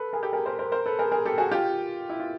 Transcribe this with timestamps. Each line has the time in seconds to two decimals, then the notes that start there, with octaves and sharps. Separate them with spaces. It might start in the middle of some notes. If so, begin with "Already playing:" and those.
Already playing: A4 B4
0.13 G#4 A#4
0.23 G4 A4
0.33 G#4 A#4
0.46 A#4 C5
0.59 A#4 C5
0.72 A#4 C5
0.86 A4 B4
0.99 G#4 A#4
1.12 G#4 A#4
1.25 G4 A4
1.38 F#4 G#4
1.51 F4 G4
2.09 E4
2.20 F4